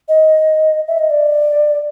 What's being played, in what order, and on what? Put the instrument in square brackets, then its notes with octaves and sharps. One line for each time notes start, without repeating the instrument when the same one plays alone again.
[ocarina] D#5
E5
D#5
D5